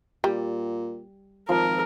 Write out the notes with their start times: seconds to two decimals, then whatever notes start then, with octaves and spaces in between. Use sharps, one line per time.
0.24 A#2 G3
1.49 G#1 F3 A#4